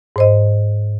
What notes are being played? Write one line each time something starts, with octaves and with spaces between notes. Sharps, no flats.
G#2 C5 D#5